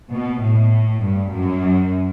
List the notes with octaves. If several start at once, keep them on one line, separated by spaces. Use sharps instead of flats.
B2
A2
G2
F#2